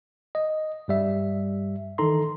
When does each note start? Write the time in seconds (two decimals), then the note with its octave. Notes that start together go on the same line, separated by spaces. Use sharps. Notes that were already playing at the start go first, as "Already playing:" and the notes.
0.35 D#5
0.88 G2 G3 E5
1.98 D#3 E3 D#4 A4 A#5 C6